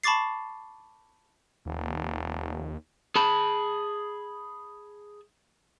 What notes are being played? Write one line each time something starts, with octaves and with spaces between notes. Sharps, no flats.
A5 B5 C#6 D6 A6 C7
F1 D#2
G#4 A5 B5